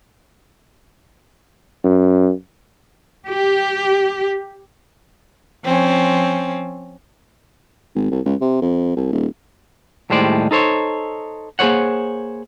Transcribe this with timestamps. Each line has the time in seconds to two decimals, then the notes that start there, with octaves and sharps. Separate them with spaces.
1.84 F#2
3.28 G4
5.64 F3 C4 C#4
7.95 G#1
8.11 C2
8.25 C#2
8.41 C3
8.62 F2
8.96 C2
9.12 D#1
10.10 D#2 A2 G3 G#3 C5 D5
10.51 D#4 A4 C5 C#5
11.59 A#3 G#4 A#4 C5 C#5 F#5